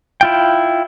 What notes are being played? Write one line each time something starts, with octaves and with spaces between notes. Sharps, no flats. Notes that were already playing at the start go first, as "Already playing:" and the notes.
E4 F4 G5